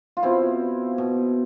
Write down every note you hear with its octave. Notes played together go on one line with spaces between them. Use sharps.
F4
B2 C4 E4
B2